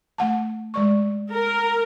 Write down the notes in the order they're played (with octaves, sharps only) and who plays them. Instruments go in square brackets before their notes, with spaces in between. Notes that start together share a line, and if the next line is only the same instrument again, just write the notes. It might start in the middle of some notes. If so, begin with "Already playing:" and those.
[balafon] A3 F#5 A5
G#3 D5 C#6
[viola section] A#4